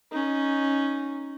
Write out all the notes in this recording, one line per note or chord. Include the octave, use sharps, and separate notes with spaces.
C#4 D#4